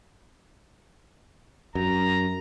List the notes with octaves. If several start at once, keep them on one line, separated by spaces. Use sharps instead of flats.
F#2 A#5